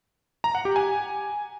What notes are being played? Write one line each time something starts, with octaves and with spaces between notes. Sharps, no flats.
A#5
F#5
G4
G#5